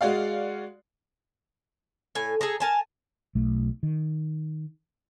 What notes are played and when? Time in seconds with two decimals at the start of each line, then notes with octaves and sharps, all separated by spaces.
0.01 G#3 F#4 D5 F5
2.15 A2 G#5
2.41 G#4 A4 A#5
2.60 A#4 G#5 A5
3.35 B1 A3
3.83 D#3